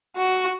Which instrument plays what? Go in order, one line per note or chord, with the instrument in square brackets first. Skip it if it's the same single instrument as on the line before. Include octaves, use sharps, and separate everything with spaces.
[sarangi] F#4